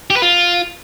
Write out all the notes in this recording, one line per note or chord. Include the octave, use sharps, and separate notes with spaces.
G4
B4
F4